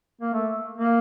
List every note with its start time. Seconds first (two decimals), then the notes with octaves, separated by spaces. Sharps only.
0.21 A#3
0.33 A3
0.78 A#3